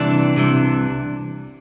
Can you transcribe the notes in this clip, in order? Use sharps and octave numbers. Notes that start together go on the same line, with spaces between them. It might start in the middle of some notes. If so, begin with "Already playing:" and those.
Already playing: C2 C3 E3 D4
C2 C3 E3